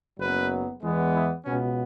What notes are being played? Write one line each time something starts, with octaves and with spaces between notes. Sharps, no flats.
F#1 F#2 F#3 B3 B4
E2 E3 G#3 B3
E4
C#2 B2 B3 C#4